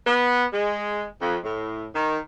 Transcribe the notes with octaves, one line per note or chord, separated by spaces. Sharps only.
B3
G#3
F2
A2
D#3